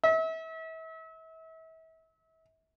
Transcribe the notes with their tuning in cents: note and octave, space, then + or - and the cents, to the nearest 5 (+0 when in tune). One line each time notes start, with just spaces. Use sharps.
E5 -35